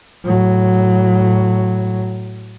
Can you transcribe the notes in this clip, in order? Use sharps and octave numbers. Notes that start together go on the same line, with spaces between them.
A2 F#3